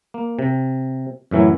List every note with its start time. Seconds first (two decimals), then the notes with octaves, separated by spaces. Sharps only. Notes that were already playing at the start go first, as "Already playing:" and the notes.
0.14 A#3
0.39 C3
1.31 F#2 A2 E3 F#3